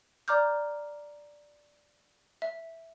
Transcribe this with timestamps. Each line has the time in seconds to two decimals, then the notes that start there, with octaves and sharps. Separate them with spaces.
0.28 D5 A#5 D6 F6 G6
2.42 E5